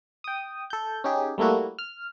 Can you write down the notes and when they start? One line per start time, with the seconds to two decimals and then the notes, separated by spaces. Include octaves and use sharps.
0.24 G5 D#6
0.70 A4 G6
1.04 C#4 D#4 G4 G#4
1.38 G3 A3 A#3 E4 F#4
1.79 F6